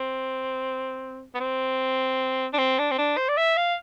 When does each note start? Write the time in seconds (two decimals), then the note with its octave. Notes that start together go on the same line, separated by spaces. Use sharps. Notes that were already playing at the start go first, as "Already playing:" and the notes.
Already playing: C4
1.34 B3
1.40 C4
2.53 D4
2.58 C4
2.78 D4
2.91 C4
2.98 D4
3.17 C5
3.28 D5
3.37 E5
3.57 F5